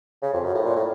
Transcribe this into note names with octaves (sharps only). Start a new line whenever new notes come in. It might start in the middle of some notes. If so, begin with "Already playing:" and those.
C#3
F2
F#2
A2
A#2
A2